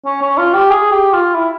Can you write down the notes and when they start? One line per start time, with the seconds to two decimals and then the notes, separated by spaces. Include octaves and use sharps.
0.06 C#4
0.22 C#4
0.38 F4
0.54 G4
0.70 G#4
0.92 G4
1.13 F4
1.34 E4